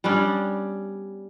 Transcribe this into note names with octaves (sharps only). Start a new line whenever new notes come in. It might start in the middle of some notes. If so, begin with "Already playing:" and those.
G3 B3 C#4 D4